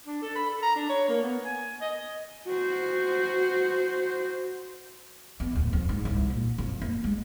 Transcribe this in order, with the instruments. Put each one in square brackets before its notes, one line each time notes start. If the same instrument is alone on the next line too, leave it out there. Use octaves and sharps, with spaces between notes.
[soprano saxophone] D4
A4
B5
A4
A#5
D4
C#5
A#3
B3
G#5
D#5
[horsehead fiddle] F#4 C5
[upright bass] E2
D1
F2
G#2
C2
A#2
F2
A#3
G#3